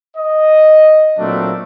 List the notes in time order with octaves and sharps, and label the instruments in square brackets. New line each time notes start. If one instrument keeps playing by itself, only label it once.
[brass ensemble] D#5
A#2 F#3 A3 A#3 C4 D4